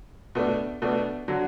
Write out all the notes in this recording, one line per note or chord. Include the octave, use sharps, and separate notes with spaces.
B2 A3 D4
B2 A3 D4
D3 F#3